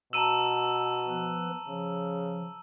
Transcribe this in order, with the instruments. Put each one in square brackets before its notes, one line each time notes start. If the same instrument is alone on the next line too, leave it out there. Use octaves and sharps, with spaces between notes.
[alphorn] B2 [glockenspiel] A5 A#5 E7 [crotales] E6 D#7
[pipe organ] F3 B3 B4
[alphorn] C#3 [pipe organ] F3